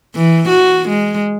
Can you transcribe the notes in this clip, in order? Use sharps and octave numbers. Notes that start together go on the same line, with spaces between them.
E3
F#4
G#3